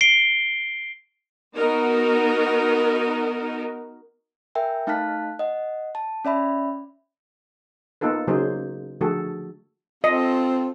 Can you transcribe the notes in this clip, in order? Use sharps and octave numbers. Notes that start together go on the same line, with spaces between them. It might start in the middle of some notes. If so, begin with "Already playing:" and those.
C7 D7 G7
B3 D#4 F#4 A#4
A#4 E5 G5 G#5
A3 D#4 F5 A5 F#6 B6
D#5 F#5
A5
C#4 D5 E5 B5
A#3 B3 D#4 F4 A4 B4
C#3 F#3 A#3 D#4 G#4 C5
D3 F3 A3 F#4 G#4 A4
C4 F4 A4 D#5